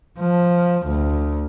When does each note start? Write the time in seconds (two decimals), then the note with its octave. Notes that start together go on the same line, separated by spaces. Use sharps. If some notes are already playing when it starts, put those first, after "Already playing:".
0.19 F3
0.87 D2